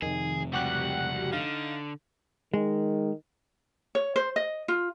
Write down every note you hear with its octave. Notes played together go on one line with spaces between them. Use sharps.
F2 C3 D#3 G#4
C#2 G3 F#4 G4 F#5 F#6
D3 D#4 F5
D#3 G#3
C#5
C5
D#5
F4